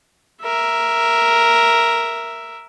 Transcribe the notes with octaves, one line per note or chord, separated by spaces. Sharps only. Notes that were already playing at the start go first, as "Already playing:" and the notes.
A#4 E5